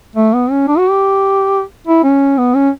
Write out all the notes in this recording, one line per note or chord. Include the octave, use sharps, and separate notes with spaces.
A3
B3
C#4
D4
F#4
G4
E4
C#4
B3
C#4